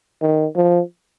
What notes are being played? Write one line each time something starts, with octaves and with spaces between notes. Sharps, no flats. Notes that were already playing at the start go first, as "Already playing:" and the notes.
D#3
F3